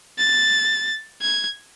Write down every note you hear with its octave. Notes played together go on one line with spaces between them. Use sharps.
A6
G#6